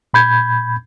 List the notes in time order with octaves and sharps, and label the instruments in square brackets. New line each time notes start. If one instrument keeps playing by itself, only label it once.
[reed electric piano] A#2 B5 G6 G#6